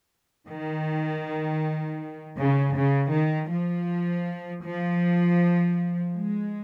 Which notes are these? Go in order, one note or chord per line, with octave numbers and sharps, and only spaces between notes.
D#3
C#3
C#3
D#3
F3
F3
G#3